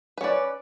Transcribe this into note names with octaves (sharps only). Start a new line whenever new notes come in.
C#4 B4 D5